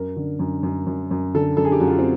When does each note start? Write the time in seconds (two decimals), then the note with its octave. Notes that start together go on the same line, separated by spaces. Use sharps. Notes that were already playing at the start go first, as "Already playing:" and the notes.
Already playing: F#2 A#4
0.16 D3
0.39 F#2
0.63 F#2
0.86 F#2
1.11 F#2
1.34 D3 A4
1.57 F#2 A4
1.65 G#4
1.72 G4
1.80 F#2 F#4
1.87 F4
1.99 C4